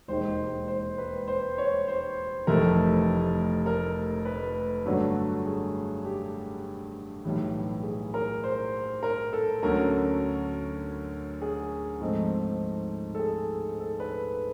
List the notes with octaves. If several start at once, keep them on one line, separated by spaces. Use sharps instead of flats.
E1 D#2 D#3 G#3 C5
C5
B4
C5
C#5
C5
F1 F2 C3 E3 A3 A#4
A#4
B4
G2 D3 F#3 A3 D4 C#5
G#4
G4
B1 A2 E3 G3
G#4
A#4
C5
A#4
A4
D2 D3 F#3 A3 C#4 A#4
G#4
G#2 F3 A3 C4 D#4
A4
G#4
A4
B4